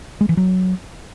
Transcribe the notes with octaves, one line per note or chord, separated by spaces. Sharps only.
G#3
E3
F#3